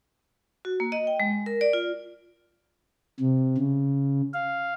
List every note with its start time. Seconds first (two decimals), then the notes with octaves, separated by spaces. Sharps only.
0.65 F#4
0.80 A#3
0.92 D#5
1.07 G5
1.20 G#3
1.46 A#4
1.61 D5
1.73 F4
3.20 C3
3.58 C#3
4.34 F5